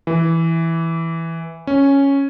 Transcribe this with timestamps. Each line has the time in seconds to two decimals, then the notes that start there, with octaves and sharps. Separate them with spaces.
0.07 E3
1.67 C#4